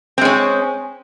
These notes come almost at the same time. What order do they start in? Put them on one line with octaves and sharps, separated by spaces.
C4 G#3 C#4